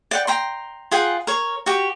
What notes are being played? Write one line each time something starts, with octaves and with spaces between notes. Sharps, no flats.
D5 F#5 G5
G5 A#5 C6
F4 G#4 F#5 G5
A#4 C#5
F#4 G4